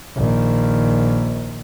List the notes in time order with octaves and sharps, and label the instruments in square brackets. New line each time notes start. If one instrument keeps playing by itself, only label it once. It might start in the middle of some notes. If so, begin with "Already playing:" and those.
[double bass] A#1 D#3